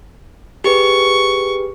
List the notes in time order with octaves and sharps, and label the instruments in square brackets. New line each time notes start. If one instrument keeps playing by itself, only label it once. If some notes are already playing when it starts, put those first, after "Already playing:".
[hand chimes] G4 G#4 B4 [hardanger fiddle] C#6